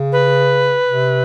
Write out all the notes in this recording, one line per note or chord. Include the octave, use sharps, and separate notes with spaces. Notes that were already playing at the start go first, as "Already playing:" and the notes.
Already playing: C#3
B4
C3